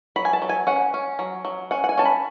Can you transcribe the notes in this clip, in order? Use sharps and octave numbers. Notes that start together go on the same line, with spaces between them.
F#3 B5
G#5
A5
F#3
G#5
C#4 F#5
C#4
F#3
F#3
C#4 F#5
F#5
G#5
C#4 A5
B5